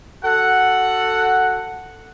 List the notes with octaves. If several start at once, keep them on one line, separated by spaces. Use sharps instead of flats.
F#4 A4 F#5